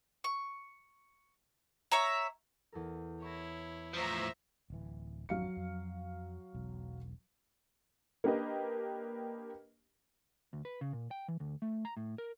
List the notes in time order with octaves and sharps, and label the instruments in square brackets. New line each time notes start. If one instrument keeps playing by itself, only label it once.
[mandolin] C#6
C#5 E5 A#5
[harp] E2 A4 A#4
[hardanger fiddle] E4 C#5 [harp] C#6 A#6
[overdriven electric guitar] A2 F3 [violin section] C5 A#5 [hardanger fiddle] E5
[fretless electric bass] D1 E3
[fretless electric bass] G#1 F2 D4 [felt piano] F#3 F5 C#7
[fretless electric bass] F2
E1 B1
[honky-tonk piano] A#3 D4 G4 B4 D#5
[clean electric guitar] D2
B4
C#3
A#2
G5
E3
D2
A3
A#5
A2
A#4